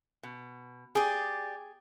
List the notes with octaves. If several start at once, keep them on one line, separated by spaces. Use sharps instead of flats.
B2
G4 G#4 D5